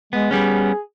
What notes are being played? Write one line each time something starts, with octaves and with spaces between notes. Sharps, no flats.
G#3 B3
G3 B3 C#4 G#4